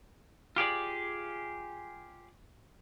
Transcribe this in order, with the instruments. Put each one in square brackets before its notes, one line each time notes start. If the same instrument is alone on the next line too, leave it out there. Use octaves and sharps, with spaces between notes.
[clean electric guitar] F4 G4 G#4 D5